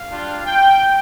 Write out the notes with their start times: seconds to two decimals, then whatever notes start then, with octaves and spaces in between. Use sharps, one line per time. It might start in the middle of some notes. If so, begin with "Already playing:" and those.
Already playing: F5
0.09 G3 D4 F4
0.46 G5